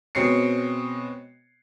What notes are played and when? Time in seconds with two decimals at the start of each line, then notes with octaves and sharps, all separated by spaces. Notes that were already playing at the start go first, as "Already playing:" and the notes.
0.15 B2 G#3 C4 C#5 C7 C#7